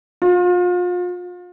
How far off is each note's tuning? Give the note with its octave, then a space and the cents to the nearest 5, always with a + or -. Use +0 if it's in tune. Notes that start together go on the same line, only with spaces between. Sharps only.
F4 +35